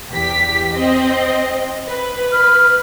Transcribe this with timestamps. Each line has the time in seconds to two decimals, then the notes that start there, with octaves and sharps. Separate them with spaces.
0.10 E2 G4 B6
0.75 C4 D#5
1.88 B4
2.32 F6